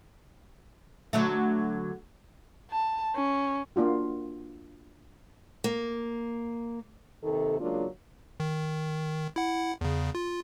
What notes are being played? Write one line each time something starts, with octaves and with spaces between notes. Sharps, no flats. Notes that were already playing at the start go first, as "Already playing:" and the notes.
D3 F#3 A3
A5
C#4
A#3 D4 F4 F#4
A#3
D#2 C3 D#3 A4
C#3 F#3 G#3 A#3 D4 F4
D#3
E4 F#5
E2 C#3
F4